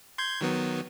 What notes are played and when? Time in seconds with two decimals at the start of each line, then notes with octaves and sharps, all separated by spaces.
0.18 C6 G6 G#6
0.41 D#3 F#3 B3